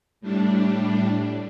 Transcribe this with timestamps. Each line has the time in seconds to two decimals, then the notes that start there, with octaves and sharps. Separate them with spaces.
0.21 A2 G3 D4